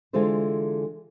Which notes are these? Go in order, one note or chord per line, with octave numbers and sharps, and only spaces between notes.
D3 E3 G#3 F4 A4 C5